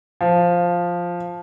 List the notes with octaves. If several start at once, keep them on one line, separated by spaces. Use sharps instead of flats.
F3